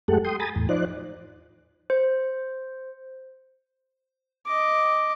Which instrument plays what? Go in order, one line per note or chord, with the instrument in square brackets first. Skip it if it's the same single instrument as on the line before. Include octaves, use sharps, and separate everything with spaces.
[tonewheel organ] F#2 G#3 A3 G4 A4 F#5
G5 C6 D#6
G#5 A#5 B5 D#6 A6
E2 A2
F3 D#4 C5 D5 F#6
[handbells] C5
[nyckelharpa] D#5 D6